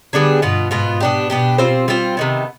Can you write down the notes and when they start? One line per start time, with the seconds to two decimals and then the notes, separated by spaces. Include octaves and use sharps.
0.13 D3 G3 B3 D4 G#4
0.42 G2 B2 B3 F4
0.71 G#2 B2 B3 F4
1.00 B2 B3 D4 G4
1.30 B2 B3 D4 G4
1.58 G3 C4 F4 C5
1.88 G3 C4 F4 C5
2.17 C3 D#3 B3